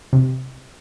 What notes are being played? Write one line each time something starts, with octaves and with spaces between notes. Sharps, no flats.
C3